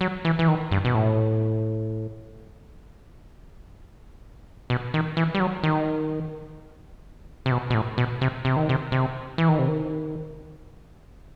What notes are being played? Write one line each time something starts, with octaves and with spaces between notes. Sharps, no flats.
F#3
E3
E3
D#3
G2
B2
A2
B2
D#3
E3
G3
F#3
D#3
C3
B2
B2
A2
B2
C3
C3
D#3
C3
C3
E3
D#3
C3
D#3